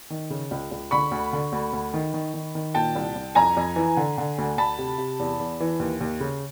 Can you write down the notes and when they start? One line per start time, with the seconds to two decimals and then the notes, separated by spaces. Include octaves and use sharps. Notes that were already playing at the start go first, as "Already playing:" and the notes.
0.10 D#3
0.30 C#3
0.51 C#2
0.71 C#2
0.91 D3 B5 C#6
1.11 D2
1.33 D3
1.52 D2
1.73 D2
1.94 D#3
2.14 D#3
2.34 D#3
2.55 D#3
2.74 A#2 G5 A5
2.96 C2
3.16 C2
3.35 F2 G#5 A#5
3.57 F2
3.76 E3
3.97 D3
4.18 D3
4.38 D2
4.57 D2 A5 B5
4.78 C3
4.98 C3
5.19 E2
5.40 E2
5.60 E3
5.80 D#2
6.01 D#2
6.20 C#3